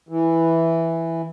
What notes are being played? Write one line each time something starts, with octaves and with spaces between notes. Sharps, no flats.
E3